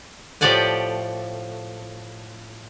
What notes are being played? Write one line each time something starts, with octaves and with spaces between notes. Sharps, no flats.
A2 F3 G4 D5 F#5 G#5